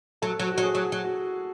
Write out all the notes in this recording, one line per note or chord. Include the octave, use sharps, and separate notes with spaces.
F#3 A4
F#3
F#4
F#3
G#4
F#3
F#3
F#4